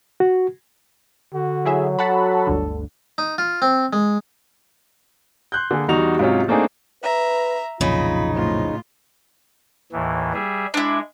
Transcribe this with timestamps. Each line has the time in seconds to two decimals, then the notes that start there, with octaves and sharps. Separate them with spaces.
0.20 F#4
1.34 D3 F#4
1.65 F#3 E4 G#4 E5
1.99 F#4 A4 F#5 A5 B5
2.47 G1 D2 D3
3.18 D#4
3.38 F4
3.62 C4
3.93 G#3
5.52 C6 F#6 G6
5.71 D3 A#3 G#4
5.88 E2 G3 D#4 F#4 F7
6.19 G#2 C3 F#3 C#4 F4
6.48 A3 A#3 C4 D4 D#4 G#4
7.03 B4 E5 A#5
7.81 B1 F2 A#2 C#3 D#4 F4 B5
8.34 A2 F3 F4
9.92 D#2 A2 E3
10.33 G3 G#4 E5
10.74 G#3 D4 E4